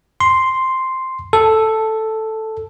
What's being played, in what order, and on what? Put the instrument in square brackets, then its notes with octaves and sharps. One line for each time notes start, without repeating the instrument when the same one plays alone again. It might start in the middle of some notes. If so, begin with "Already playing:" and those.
[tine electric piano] C6
A4